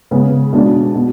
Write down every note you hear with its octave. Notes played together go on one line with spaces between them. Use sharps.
C#3 G#3 B3
B2 G#3 D4
B2